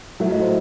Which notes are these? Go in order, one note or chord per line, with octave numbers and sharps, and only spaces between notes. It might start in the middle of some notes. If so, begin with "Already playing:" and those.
A2 F#3 A3 E5
D#5
C5